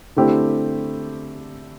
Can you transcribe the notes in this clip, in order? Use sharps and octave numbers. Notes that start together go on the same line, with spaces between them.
D3 A3 C4 E4 G4